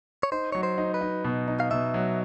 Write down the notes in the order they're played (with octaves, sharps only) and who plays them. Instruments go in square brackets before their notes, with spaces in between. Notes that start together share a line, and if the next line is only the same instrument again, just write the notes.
[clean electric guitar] C#5
[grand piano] D#4 [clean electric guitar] C5
[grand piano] F#3 [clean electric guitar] C#5
[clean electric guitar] C5
[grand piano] D#4
[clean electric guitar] B4
[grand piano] D#4
B2
D#4
[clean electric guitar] F5
[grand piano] B2 [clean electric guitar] E5
[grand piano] F#3